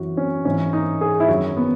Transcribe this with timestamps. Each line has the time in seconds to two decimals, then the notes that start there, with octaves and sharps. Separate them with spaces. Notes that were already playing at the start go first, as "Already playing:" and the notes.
Already playing: F#2 E3 F#4
0.17 C#4
0.45 G#2 E3 C#4
0.73 D#4
1.01 G#4
1.20 E4
1.28 F#2 D#3 F#3 F#4
1.57 B3